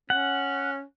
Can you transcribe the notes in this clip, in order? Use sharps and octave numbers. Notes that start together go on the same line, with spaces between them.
C#4 F#5